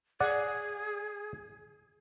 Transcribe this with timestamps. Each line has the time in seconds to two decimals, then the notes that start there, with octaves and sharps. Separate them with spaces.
0.20 G#4 D5 F#5